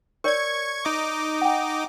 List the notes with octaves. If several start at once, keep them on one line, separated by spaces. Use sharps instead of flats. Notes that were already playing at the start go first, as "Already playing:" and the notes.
A#4 C#5 D5 C#6 G#6
D#4 D#5 D6
F#5 G5